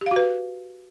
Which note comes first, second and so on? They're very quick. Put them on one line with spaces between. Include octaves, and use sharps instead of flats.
G4 F5 F#4 B4